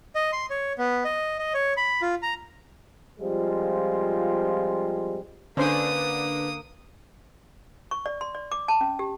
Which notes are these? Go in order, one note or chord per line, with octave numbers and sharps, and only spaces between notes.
D#5
C6
C#5
B3
D#5
D#5
C#5
B5
F4
A#5
F3 G3 G#3 C4 F4
D3 A#3 C#4 D4 B4 C5 C6 D#6
C#6
D5
C6
D5
D6
A5
C#4
G4